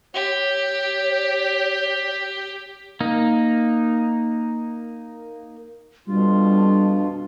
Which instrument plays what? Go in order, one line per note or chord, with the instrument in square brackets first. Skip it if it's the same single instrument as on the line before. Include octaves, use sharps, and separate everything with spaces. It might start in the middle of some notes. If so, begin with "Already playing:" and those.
[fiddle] G4 [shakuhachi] C#5
[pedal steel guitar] A#3 D#4
[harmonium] F2 B2 F4 [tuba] G3 [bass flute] D4